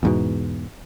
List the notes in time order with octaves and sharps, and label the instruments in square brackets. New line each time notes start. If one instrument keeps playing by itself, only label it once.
[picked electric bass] E2 G#2 B2